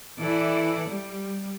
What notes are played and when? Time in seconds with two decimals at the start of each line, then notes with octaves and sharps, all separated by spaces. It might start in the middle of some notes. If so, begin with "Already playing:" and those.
0.20 E3 E4 A4 D5
0.87 G3